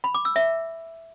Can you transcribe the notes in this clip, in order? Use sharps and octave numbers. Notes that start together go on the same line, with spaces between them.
B5
D6
E6
E5